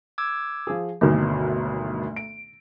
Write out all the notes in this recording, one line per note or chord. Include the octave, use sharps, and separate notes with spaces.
D6 E6 G#6
F3 G#4
G1 D2 B2 D#3 F#3 A3 A#3
D7